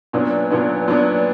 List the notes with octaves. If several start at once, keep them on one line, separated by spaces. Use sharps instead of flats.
A#2 F#3 B3 D4
A#2 F#3 B3 D4
A#2 F#3 B3 D4